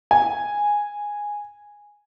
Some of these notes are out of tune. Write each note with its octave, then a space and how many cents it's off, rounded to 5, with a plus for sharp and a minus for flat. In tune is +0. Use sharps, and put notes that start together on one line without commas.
G#5 -5